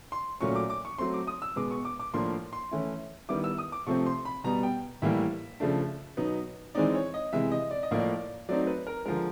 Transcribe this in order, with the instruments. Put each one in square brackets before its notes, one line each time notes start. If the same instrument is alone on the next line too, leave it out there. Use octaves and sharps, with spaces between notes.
[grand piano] C6
A#2 F#3 A3 C#4 C#6
D6
D6
C#6
F#3 A3 C4 C6
D6
D#6
E6
B2 G#3 B3 D6
C#6
D6
D6
A2 F3 A#3 D4 C6
C6
E3 A3 C#4 E4
D#3 G3 B3 E4 D6
E6
D#6
D6
C3 F3 A3 C4 C#6
C6
B5
B2 G3 B3 A#5
G5
A2 E3 G3 A#3 E5
C#3 F3 A3 D4
B2 F#3 B3 D#4
E3 G#3 C4 D#4 D5
C#5
D#5
C3 E3 G#3 E5
D#5
D5
D#5
A2 F3 A#3 D5
F#3 A3 C4 D#4 D5
B4
A#4
D3 F3 G#3 A#4